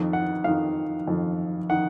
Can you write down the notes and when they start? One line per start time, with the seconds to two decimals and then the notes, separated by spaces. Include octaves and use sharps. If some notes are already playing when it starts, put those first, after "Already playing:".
Already playing: F2 D#3
0.13 F#5
0.44 F2 D#3 F5
1.07 F2 D#3
1.70 D#3 F#5